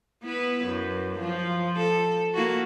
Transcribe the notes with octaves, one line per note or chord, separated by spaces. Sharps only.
B3 E4 B4
F#2
F3
A4
A#3 E4 F#4